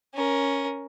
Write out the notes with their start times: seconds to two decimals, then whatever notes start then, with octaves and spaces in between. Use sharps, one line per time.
0.14 C#4 A#4